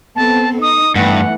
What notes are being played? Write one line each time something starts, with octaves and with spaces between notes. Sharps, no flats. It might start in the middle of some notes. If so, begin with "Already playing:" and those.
B3 C4 A4 A5
D#4 D#6
G2 E3 A3 B3 F#5